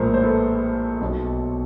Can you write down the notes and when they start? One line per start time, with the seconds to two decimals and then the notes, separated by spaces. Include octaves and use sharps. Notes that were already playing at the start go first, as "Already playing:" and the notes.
Already playing: A#1 A2 F3 G#3 A#4 C5
0.14 C5
0.23 A4 B4
1.01 B1 B2 F#3